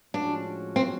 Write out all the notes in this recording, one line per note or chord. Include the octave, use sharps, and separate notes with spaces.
A2 F3 G#3 C#4 D4 F#4
C4